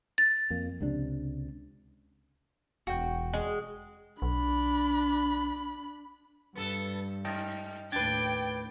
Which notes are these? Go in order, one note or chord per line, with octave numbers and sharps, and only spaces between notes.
A6
F2 A#3
C#2 C3 D4
E1 F#4 G5
G#3
B1 D4 B5
G2 B3 A4
G#2 D#5 G5 A5
D#2 A2 D4 B4 G5 G#6 A6